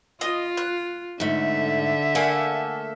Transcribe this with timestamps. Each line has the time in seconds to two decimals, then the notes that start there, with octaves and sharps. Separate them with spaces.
0.21 F4 D#5 D#6
0.57 F#6
1.20 G#2 D3 A3 E5
2.15 A3 A#3 A4 D5 F#5 G#5